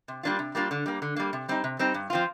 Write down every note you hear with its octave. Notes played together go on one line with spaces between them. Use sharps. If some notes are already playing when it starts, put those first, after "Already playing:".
C3
G3 A#3 D4 F4
C3
G3 A#3 D4 F4
D3
G3 A#3
D3
G3 A#3
C3
G3 C4 D#4
C3
G3 C4 D#4
G2
F3 C4 F4